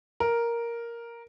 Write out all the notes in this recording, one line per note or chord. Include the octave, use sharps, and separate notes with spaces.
A#4